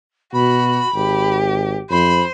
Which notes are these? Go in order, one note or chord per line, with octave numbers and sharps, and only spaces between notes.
B2 F#4 B5
G#1 G4
F2 C5 B5